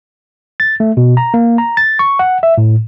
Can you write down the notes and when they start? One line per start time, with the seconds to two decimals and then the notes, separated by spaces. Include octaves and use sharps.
0.60 A6
0.80 A3
0.97 B2
1.17 A#5
1.34 A#3
1.58 A#5
1.77 A6
1.99 C#6
2.19 F#5
2.43 E5
2.58 A2